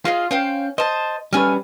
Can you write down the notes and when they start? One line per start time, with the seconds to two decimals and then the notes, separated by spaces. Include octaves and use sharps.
0.05 F4 G#4 D#5 F5
0.31 C#4 C5 F5 G5
0.78 C5 D#5 A5
1.33 G3 A3 C#4 B4 G#5 F6